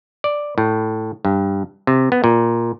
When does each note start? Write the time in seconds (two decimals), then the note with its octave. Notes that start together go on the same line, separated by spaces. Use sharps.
0.24 D5
0.58 A2
1.25 G2
1.87 C3
2.12 B3
2.24 A#2